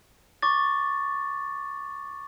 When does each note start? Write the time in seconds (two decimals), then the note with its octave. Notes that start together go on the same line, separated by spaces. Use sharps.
0.42 C#6 D6 A6